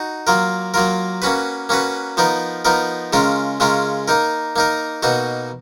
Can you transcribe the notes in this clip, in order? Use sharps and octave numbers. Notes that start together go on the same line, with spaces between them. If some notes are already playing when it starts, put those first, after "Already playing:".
Already playing: D#4 F#4
F#3 A#3 F4 A#4
F#3 A#3 F4 A#4
A#3 C#4 F#4 B4
A#3 C#4 F#4 B4
F3 B3 D#4 A#4
F3 B3 D#4 A#4
C#3 G#3 C#4 F4 A#4
C#3 G#3 C#4 F4 A#4
A#3 D#4 A#4
A#3 D#4 A#4
B2 A#3 D#4 F#4